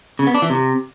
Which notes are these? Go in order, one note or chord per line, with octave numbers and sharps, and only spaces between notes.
C#3
B3
D4
E3
C3